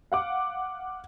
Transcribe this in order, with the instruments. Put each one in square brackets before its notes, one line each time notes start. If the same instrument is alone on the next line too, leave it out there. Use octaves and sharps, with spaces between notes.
[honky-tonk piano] F5 F#5 D6